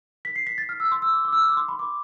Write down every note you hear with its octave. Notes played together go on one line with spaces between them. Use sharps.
B6
C7
B6
A6
F6
E6
C6
E6
D6
D6
E6
F6
D6
C6
B5
D6